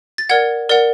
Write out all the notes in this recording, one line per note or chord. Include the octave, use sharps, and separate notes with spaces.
A6
A#4 D5 F#5 G#6
A#4 D5 F#5